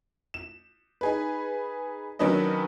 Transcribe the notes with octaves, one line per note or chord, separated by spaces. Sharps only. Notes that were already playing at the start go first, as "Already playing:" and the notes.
E7
D#4 G#4 B4
D#3 F#3 C#4 D4 B4 D#5